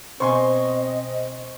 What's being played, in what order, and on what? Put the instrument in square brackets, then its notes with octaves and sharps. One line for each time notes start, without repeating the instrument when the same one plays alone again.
[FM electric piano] B2 C5 [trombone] C4 [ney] D#5 [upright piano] G#5 C6 C#6